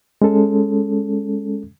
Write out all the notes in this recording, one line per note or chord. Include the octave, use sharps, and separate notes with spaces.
G#3 C#4 A4